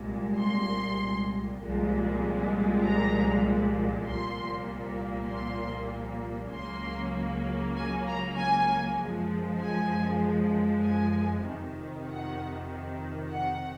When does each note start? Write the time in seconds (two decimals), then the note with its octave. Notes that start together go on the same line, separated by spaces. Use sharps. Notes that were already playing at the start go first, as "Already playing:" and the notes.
Already playing: C2 A#2 G#3
0.39 C6
1.62 C2 A#2 F3 G#3
2.84 A#5
4.07 C2 A#2 F3 A#3 C6
5.31 C6
6.53 C#2 C#3 F#3 A#3 C6
7.76 G#5
8.07 A#5
8.38 G#5
8.99 F#2 F3 G#3
9.61 G#5
10.85 G#5
11.46 F2 C3 D#3
12.08 F#5
13.30 F#5